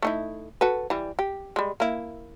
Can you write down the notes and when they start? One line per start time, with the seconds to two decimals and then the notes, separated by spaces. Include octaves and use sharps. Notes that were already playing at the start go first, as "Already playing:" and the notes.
0.03 A3 D#4 E4
0.61 F#4 A4 B4
0.90 E3 G3
1.19 G4
1.56 G3 G#3
1.80 A#3 E4